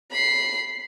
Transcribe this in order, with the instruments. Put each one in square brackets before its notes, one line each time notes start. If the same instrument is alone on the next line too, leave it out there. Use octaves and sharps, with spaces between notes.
[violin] B5 C7